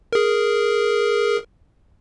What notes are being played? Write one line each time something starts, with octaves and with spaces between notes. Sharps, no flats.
G#4 A#4